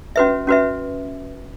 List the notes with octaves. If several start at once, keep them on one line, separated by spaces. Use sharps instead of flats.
C#4 F#4 B4 E5
C#4 F#4 B4 E5